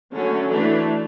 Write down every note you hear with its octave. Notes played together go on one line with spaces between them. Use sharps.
D3 F#3 A3 C#4
E3 A3 D4